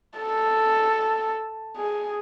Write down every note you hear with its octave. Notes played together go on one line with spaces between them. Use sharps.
A4
G#4